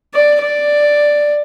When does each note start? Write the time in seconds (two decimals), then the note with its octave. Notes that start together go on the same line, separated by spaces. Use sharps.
0.14 D5
0.41 D5